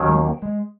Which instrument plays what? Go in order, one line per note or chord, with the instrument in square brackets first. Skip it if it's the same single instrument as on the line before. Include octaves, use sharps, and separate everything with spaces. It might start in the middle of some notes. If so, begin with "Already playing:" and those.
Already playing: [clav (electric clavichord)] D#2 D#3 F#3 C#4
[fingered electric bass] G#3
A#3
G#3